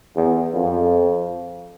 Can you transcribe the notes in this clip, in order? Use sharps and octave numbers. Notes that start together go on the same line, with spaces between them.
E2
F2